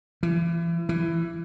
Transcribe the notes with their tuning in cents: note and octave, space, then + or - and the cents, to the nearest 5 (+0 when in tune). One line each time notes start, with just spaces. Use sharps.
E3 +35
E3 +15